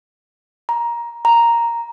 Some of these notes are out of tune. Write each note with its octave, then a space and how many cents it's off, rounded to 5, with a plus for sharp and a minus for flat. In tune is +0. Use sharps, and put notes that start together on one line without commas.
A#5 +15
A#5 +0